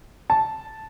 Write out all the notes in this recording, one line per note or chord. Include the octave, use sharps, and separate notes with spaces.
A5